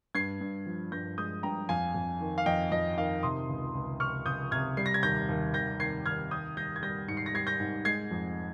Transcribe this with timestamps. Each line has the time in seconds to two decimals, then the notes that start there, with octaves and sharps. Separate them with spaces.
0.15 G2 G#6 C7
0.41 G2
0.66 F3
0.92 G2 G6 A#6
1.18 G#3 D#6 G6
1.43 G2 G5 A#5
1.69 F2 F5 G#5
1.95 F2
2.21 D#3
2.38 F5
2.46 F2 D#5 G5
2.72 F2 D#5
2.97 D#3 F5
3.23 C3 C6 D#6
3.49 C#2
3.75 C#2
4.00 C3 C#6 F6
4.26 C#2 D#6 G6
4.51 C3 F6 G#6
4.77 G3 C7
4.86 A#6
4.94 G#6
5.03 D#2 G6 A#6
5.29 D#2
5.54 D#2 G6 A#6
5.80 D#3 G#6 C7
6.05 D#2 F6 G#6
6.31 D#3 D#6 G6
6.57 G3 G6 A#6
6.76 G#6
6.82 G3 G6 A#6
7.08 G#2 C#7
7.17 C7
7.26 A#6
7.34 G3 G#6 C7
7.47 G6 A#6
7.60 G#2
7.85 G#3 G#6 C7
8.11 F2